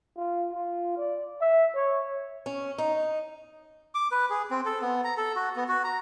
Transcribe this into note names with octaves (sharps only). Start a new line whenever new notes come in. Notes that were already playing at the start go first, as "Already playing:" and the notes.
F4
F4
D5
E5
C#5
C#4
D#4
D6
B4
G#4
C4
A4
B3
A#5
A4
F#4
B3
F#4
A#5